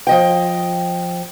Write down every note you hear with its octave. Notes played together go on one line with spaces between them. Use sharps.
F3 D#5 G5